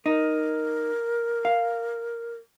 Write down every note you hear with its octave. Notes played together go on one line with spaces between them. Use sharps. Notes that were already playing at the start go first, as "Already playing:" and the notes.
D#4 A#4
F5